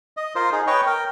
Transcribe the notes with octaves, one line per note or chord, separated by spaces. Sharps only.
D#5
F4 A#4 C5
D#4 G#4
B4 C#5 D#5 G5 C#6
A#4 G5